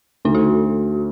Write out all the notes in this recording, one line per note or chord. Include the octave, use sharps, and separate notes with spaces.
D2 D#4
F#4